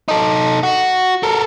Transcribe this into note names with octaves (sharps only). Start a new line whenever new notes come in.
D#4 A4
F#4
A4 A#4